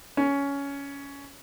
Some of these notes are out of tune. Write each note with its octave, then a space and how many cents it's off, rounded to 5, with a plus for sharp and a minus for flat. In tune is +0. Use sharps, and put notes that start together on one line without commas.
C#4 +15